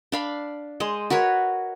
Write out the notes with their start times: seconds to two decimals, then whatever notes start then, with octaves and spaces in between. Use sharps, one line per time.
0.12 D4 F5 B5
0.80 G#3 C5 D#5
1.10 F#4 A#4 B4 C#5